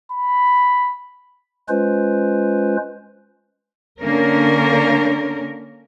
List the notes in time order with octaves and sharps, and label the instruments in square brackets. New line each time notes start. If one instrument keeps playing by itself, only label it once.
[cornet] B5
[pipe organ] G#3 C#4 F4 B4 C5
[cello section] D3 A#3 C#4 A#4